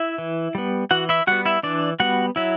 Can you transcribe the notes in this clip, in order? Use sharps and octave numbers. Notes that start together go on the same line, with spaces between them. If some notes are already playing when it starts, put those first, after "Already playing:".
Already playing: E4 E5
E3
G3 B3
E3 F#4 F#5
E4 E5
G3 B3 F#4 F#5
E4 E5
E3 D4 D5
G3 B3 F#4 F#5
F#3 E4 E5